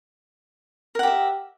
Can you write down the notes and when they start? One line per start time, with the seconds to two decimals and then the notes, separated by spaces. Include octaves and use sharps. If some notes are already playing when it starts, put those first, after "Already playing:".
0.95 A#4
0.99 F#5
1.03 G4
1.07 E5